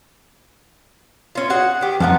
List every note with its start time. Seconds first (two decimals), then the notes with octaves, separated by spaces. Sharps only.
1.35 C#4 F4
1.50 F#4 G#4 F#5
1.81 D#3 G4
2.00 F2 F3 B3 D#4 F#5